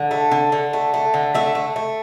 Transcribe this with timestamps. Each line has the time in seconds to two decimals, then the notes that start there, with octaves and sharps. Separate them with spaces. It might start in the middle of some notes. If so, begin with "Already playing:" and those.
Already playing: D3
0.11 A3
0.31 D3
0.52 D3
0.73 A3
0.94 A3
1.14 D3
1.34 A3 E5
1.55 A3
1.76 A3